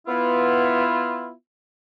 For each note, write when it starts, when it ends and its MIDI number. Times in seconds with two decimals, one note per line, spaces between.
0.08 1.31 59
0.08 1.31 64
0.08 1.31 65